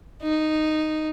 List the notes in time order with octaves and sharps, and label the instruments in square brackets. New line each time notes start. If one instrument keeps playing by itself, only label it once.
[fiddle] D#4